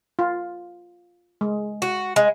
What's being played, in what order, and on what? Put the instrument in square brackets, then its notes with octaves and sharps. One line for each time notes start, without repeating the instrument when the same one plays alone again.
[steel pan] F4
G#3
[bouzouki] F#4
G#3